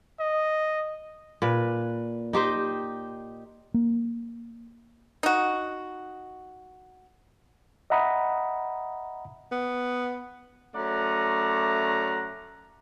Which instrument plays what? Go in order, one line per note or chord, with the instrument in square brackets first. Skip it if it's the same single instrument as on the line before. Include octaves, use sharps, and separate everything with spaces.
[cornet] D#5
[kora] A#2 B4
D#4 G4 C5 D#5
[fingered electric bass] A#3
[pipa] D#4 F#4
[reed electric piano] D#5 E5 F#5 A#5 B5 D#6
[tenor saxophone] B3
[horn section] F#2 A3 C#4 D5 F#5 A#5